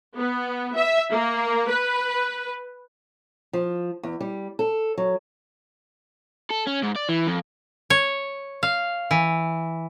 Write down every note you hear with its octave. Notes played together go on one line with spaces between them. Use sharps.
B3
E5
A#3
B4
F3
E2
G3
A4
F#3
A4
C#4
G#2
D5
E3
F2
C#5
F5
E3